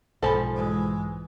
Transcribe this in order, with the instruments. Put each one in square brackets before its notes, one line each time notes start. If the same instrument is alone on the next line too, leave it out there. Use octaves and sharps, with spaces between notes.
[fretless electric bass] B1 G#2 [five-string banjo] F3 A4 [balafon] C5 G#5 B5
[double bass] E3 G#3